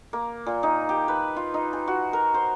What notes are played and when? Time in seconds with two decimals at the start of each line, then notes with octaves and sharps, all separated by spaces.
0.13 A#3
0.46 A#2
0.63 D#4
0.89 G4
1.08 B4
1.36 F4
1.54 D#4
1.73 G#5
1.88 F#4
2.13 A#4
2.34 C5